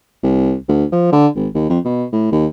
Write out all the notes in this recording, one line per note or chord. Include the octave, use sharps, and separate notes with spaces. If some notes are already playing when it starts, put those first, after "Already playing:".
C2
D2
F3
D3
G#1
D#2
F2
B2
A2
D#2